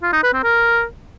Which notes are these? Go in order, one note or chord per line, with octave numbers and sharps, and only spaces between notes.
F4
D#4
B4
C4
A#4